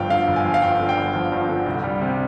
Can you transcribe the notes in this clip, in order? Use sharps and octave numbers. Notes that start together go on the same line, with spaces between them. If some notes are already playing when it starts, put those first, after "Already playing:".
Already playing: G1 G2 F3 F5 G5
D3 F5
G1
G#5
F3
F5
G2 G5
D3
G5
G1
F3
G2
D3
C2
G3
C3